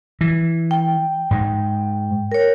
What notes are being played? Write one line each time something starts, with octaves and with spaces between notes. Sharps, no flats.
E3
G5
G#2 G#3
A#4 C#5